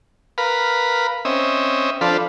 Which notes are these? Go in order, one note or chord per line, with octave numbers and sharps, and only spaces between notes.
A#4 B4 F5 B5
C4 C#4 D#5 E5
F3 D4 A4 C5 F5 B5